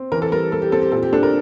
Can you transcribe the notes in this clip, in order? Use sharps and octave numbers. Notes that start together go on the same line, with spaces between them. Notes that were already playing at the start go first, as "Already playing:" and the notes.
Already playing: C4
E3 A#4
A4
G3 A#4
G3 A4
G4
C4 A4
G4
A#2 A4
G4
D4 A4
A#4